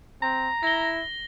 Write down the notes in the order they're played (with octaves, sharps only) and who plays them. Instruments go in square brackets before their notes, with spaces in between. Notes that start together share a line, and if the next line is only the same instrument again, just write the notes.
[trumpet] C4 [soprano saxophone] A#5
[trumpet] E4 [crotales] A#6 G7